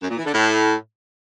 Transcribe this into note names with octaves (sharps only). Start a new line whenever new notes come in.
F#2
A#2
E3
D3
A2